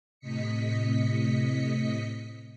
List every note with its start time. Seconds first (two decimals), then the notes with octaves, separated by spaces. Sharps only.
0.20 A2 C3 D#5 B6 C#7